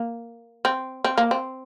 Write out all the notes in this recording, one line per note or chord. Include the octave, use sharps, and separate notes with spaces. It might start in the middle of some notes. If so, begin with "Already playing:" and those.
Already playing: A#3
C4
C4
A#3
C4